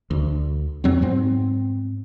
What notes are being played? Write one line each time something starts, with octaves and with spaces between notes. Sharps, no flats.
D2
F2 F#3 C4
G#2 B3 C4